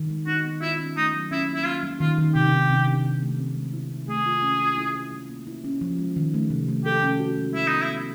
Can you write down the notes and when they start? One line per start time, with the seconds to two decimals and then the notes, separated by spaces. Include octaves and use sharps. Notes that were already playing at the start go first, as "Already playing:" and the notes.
Already playing: D#3
0.10 G#3
0.27 D#4 F#4
0.45 B3
0.61 E4 F4
0.79 C#4
0.97 A3 D#4
1.13 F#3
1.31 C#4 E4
1.49 A#3
1.55 E4
1.65 A#3 F4
1.83 G3
2.00 D#3 F4
2.18 D#3
2.35 C3 G4
2.52 D#3
2.70 C3
2.87 D4
3.05 C3
3.22 A3
3.39 C4
3.57 G#3
3.74 E4
3.92 E4
4.08 A3 G#4
4.26 F4
4.42 C#4
4.60 F4
4.78 E4
4.95 E4
5.12 G3
5.29 A#3
5.47 E4
5.64 C#4
5.81 F3
5.99 G#3
6.16 D#3
6.34 A3
6.50 C3
6.68 A3
6.85 G4 A4
7.03 C#4
7.19 F#4
7.38 G#3
7.54 G3 E4
7.68 B3 D#4
7.82 E4
7.89 B3